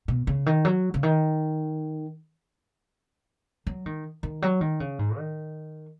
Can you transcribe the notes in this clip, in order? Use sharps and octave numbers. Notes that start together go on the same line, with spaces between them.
B2
C#3
D#3
F#3
C#3
D#3
F#3
D#3
D#3
F#3
D#3
C#3
G#2
D#3